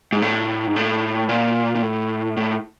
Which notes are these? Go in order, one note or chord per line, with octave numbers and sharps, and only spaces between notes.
G#2
A2
G#2
A2
A#2
A#2
A2
A2